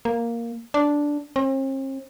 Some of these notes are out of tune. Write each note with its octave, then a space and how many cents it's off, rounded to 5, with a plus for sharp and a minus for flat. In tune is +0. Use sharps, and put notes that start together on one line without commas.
A#3 +0
D4 -5
C4 +45